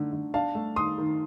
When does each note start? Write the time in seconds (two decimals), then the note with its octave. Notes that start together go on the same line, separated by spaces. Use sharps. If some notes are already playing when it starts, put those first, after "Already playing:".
Already playing: D3 A3 D#4
0.13 D3
0.34 D4 F5 A5
0.55 A3
0.76 D#3 C6 D#6
0.98 D#3